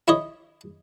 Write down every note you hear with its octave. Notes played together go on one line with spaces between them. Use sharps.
E4 C#5 D#5